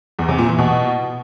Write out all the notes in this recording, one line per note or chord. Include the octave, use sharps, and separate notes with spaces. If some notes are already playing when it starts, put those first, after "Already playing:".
E2
C3
A#2
E3
B2